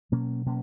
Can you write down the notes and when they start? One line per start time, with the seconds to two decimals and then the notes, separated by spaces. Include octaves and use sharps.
0.12 B2 F#3 A#3 C#4
0.46 B2 F#3 A#3 C#4